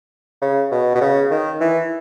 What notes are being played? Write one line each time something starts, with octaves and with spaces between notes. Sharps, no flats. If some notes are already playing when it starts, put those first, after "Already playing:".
C#3
B2
B2
C#3
D#3
E3